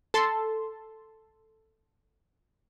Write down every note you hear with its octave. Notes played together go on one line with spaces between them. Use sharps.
A4 A5 C6